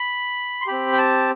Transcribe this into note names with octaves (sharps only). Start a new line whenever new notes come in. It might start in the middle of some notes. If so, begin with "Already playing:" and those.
Already playing: B5
C6
C4 G4 B5
G5
A5